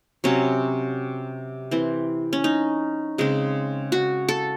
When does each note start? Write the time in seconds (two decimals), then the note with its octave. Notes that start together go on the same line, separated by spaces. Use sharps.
0.24 C3 F#3 C4 C#4
1.71 E3 C4
2.33 C#4
2.44 D#4
3.18 C#3 G#3 C4
3.92 F#4
4.29 A4